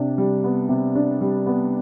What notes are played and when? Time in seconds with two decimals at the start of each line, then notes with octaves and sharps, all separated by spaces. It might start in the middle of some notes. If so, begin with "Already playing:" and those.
Already playing: C3 D4
0.18 G3
0.44 B3
0.69 C3
0.95 D4
1.21 G3
1.46 B3